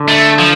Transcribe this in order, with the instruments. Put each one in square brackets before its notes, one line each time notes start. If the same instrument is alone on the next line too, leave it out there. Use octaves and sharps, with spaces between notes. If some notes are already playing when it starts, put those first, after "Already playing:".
Already playing: [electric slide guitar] D3
[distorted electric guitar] A3
F3